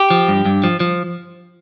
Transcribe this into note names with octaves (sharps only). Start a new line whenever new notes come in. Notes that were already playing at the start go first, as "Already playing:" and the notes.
Already playing: G4
F3
G2
G2
F3
F3